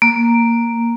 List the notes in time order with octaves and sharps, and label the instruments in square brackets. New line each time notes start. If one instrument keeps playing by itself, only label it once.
[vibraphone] A#3